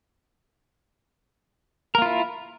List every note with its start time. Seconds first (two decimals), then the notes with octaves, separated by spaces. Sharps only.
1.95 A#4
1.98 A#3
2.02 F4
2.06 E4